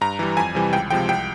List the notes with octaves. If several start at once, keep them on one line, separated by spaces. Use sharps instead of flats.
G2 A#5
E3 G3
F2 G#5
C3 E3 G3
C#2 G5
C3 F3 G#3 G5
C2 G5